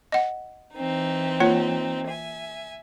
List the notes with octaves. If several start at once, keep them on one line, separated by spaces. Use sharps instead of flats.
D#5 F#5
E3 C4 D#4
A#3 F4 C#5
E5 G#5